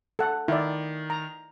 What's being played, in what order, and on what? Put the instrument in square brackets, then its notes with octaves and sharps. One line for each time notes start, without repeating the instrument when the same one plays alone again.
[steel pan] A4 F#5
[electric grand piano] D#3 [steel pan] E4 D5
[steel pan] A#5